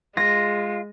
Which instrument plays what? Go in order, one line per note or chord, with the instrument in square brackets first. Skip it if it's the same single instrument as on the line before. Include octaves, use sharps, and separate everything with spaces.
[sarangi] G#3 [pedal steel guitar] F4 [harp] A#6